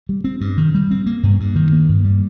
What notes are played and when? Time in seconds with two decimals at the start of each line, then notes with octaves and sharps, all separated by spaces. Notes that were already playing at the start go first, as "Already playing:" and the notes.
0.09 G3
0.24 C4
0.41 G2
0.58 D#3
0.74 G3
0.91 C4
1.06 A#3
1.23 G2
1.40 G2
1.56 D#3
1.72 A#3
1.89 G2
2.04 G3